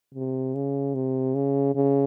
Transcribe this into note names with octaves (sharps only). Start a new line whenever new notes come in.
C3
C#3
C3
C#3
C#3